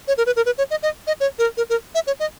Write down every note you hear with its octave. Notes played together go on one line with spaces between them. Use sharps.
C#5
A#4
B4
A#4
B4
C#5
D#5
D#5
D#5
C#5
A#4
A#4
A#4
E5
C#5
D#5